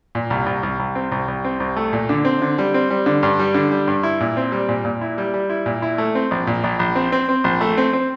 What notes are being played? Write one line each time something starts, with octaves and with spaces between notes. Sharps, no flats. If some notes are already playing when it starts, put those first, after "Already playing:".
A#2
C2
C2
C2
C2
C4
C2
C2
C4
C2
A3
A#2
D3
C4
D3
G3
C4
G3
D3
G2
G3
D3
G3
G2
E4
A#2
C4
G3
A#2
A#2
E4
G3
G3
E4
A#2
E4
A3
C4
A#1
A#2
A#1
A#1
C4
C4
C4
A#1
A3
C4
C4